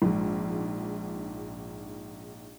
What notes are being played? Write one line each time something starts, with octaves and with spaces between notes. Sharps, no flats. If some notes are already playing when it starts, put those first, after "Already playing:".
A#1 G#2